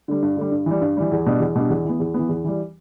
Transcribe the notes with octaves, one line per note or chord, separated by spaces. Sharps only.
D3 G3
G2
D3 G3
G2
E3 G3
G2
E3 G3
E2
B2 G3 D4
E2
B2 G3 D4
E2
E3 B3
E2
E3 B3
E2
E3 G3